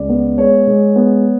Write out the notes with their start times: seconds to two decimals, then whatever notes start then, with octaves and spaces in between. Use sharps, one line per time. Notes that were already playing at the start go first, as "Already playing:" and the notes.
Already playing: C#2 D5
0.09 B3
0.38 G#3 C#5
0.67 G#3
0.96 B3